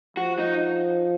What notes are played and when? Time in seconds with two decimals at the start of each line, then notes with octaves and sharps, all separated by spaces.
0.17 F3 F#4
0.39 D#4